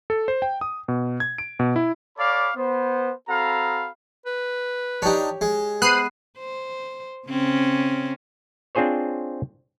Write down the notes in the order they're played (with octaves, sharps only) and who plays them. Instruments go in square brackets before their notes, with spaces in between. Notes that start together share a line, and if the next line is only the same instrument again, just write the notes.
[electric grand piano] A4
C5
G5
D#6
B2
G#6
D7
B2
E4
[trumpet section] A4 C#5 D5 F5 B5 D6
B3 C5
C4 F#4 A4 F5 A#5 B5
[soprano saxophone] B4
[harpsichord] D4 D#4 [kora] G4 C#5
[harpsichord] G#3
[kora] B3 [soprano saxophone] C5 [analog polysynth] F#6 C7 D#7
[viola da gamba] C5
C#3 C4 C#4
[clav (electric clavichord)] C4 D4 F4 G#4 C5 C#5